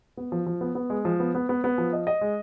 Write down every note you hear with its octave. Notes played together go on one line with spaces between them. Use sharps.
B3
F3
F3
B3
B3
G#3
F3
B3
B3
B3
B3
F3
D#5
D#5
G#3